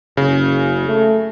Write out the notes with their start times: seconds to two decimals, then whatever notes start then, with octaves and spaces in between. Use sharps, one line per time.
0.17 F#1 C#3
0.87 A3